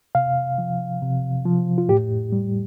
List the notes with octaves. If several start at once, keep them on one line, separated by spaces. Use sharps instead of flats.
C3 F5
F3
C3
F3
F4
A2 G4
G3